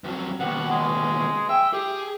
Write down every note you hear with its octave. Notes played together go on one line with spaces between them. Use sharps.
F2 F#3
D#2 B2 F#5
G#3
E5 G5
G4 G#4